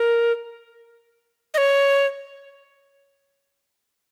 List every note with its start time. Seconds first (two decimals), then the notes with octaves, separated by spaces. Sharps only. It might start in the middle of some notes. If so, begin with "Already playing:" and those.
Already playing: A#4
1.54 D#5
1.58 C#5